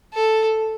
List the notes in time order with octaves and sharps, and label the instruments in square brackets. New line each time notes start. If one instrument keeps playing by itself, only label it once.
[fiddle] A4